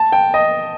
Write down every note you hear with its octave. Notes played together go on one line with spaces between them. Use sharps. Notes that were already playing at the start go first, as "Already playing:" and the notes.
Already playing: A5
G5
D#5